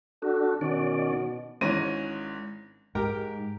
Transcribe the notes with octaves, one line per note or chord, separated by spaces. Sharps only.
D4 F#4 A4
B2 D#3 C#4 D5
G#1 G#2 C#4 E4 A#6 D#7
G#2 G4 A#4 G5